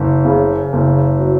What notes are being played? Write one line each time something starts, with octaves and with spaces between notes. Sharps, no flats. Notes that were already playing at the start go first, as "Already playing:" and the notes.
Already playing: F#1
C#3
F#1
F#3